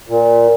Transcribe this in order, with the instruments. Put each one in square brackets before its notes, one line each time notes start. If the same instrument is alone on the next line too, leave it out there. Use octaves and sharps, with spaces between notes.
[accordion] A#2